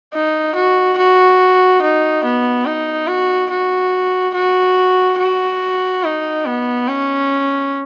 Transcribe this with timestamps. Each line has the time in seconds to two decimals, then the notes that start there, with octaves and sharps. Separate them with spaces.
0.14 D#4
0.55 F#4
0.98 F#4
1.82 D#4
2.24 B3
2.65 D#4
3.08 F#4
3.50 F#4
4.34 F#4
5.18 F#4
6.04 D#4
6.45 B3
6.88 C#4